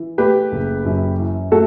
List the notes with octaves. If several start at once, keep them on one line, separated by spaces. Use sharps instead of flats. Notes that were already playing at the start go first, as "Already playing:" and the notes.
Already playing: E3
A3 G4 B4
F#1
F#2
E3
A3 F#4 A4